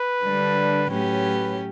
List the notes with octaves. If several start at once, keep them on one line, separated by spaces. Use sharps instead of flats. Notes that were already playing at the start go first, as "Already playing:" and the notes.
Already playing: B4
D3 G3 D4
A2 F#3 C#4 G4 B4